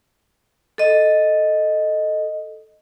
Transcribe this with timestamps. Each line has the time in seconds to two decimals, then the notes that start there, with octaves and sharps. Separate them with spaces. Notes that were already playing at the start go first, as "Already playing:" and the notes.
0.78 A4 D#5